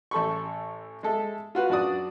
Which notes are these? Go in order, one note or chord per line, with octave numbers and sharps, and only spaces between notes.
A1 A4 B5 C#6
G#3 A4 E5
F4 F#4 B4
F#2 D4 F#4 D5 D#6